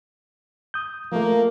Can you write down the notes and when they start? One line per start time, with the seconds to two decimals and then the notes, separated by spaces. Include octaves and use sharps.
0.74 D#6 G6
1.12 F3 A3 A#3